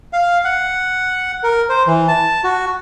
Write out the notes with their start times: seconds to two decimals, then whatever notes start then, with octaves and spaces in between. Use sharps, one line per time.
0.13 F5
0.45 F#5
1.44 A#4
1.69 C5
1.87 E3
2.08 A5
2.44 F#4